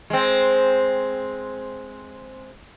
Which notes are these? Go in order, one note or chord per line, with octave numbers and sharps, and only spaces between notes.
G#3 C4